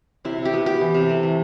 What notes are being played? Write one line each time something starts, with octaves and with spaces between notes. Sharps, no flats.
C3 E4
C3
G4
B3
B3 G4
E3
C3
A3
E3